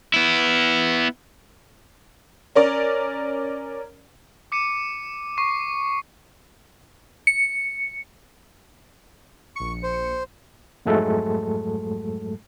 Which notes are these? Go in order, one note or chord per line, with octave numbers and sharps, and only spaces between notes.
B3 E4
C#4 A#4 D5
D6 C#7 D#7 E7
C#6 C7
C#7
A#1 C#6 C#7
C5
F2 G#2 F#3 G#3 A3 A4